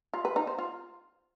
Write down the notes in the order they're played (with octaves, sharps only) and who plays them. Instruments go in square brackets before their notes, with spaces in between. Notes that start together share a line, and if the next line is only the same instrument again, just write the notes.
[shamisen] F4
B4
D#4
C5
F4